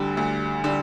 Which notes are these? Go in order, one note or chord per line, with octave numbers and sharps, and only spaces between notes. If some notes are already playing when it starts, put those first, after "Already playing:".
Already playing: D2 D3 G3
D2
D3 G3